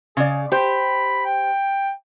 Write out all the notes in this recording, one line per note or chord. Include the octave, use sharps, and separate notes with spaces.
C#3 G#4 D5
G4 C5 B5
G5